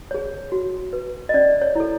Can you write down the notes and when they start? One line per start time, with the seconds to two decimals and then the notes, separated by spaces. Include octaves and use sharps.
0.11 G#4 C#5
0.52 F#4
0.93 B4
1.29 D#5
1.34 C#4 D5
1.62 C#5
1.75 E4 A4